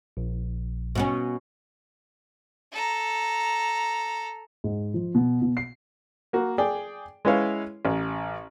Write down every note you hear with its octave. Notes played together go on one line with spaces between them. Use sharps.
A#1
B2 B3 C#4
A4 A#5
G#2
F3
B2
B2
C7
A#3 F#4
G#4 D5 G5
G#3 C#4 E4 B4 C#5 F5
A1